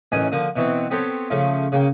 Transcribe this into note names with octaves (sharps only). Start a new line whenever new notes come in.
A1 D#3 E3 C#4 G#5 D#6
D3 F3 A#3 D#6
B2 E3 F#3 C4
B3 C4 G4 A4 C5 C#5
C#3 F3 A3 F4
C#3 A#3 G5